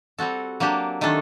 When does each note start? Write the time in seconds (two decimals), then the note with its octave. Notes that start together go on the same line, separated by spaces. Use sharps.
0.19 G3 C4 F#4 A4
0.60 F#3 A#3 D4 G4
1.01 D#3 A3 D4 A4